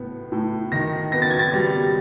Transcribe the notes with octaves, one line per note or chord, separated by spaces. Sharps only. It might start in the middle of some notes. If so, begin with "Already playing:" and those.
Already playing: A2 B3
A2
D#3 A#6
B3 A#6
A6
G#6
A6
G3